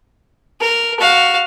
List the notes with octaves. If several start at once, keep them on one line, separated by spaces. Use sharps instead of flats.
A#4
F#4 F5